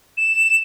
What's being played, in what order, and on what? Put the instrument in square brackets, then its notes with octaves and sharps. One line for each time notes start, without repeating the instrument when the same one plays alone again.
[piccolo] E7